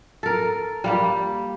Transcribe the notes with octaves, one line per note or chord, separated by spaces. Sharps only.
A4 A#4
G3 A#3 G4